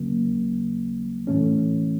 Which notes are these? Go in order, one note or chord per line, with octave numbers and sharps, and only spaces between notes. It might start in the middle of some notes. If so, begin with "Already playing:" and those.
Already playing: D#2 C#3 F#3 A#3
A2 E3 A3 C#4